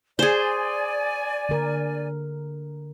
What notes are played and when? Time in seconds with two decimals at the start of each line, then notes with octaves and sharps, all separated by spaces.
0.19 G#4 C5 D5 G#5
1.49 D3 A#4